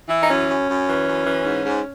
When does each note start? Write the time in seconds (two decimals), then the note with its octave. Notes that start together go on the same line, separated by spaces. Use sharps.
0.09 E3 E4
0.21 D#4
0.28 F#2 C#4
0.49 F#2
0.68 F#2
0.87 E3
1.06 F#2
1.26 E3
1.45 G#2
1.65 G#2